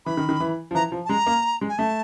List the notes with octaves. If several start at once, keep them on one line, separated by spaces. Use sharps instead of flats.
E3 B5
D#3
D#3
E3
F3
E3 A#5
F3
A5
G#3 A#5
A#3
G#3
G#5
A3 A5